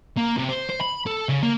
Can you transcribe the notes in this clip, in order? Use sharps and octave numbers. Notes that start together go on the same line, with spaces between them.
A#3
C3
C5
C5
B5
A4
C#3
A#3